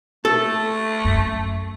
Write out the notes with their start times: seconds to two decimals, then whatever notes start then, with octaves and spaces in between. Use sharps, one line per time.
0.25 A3 A4
1.05 F#2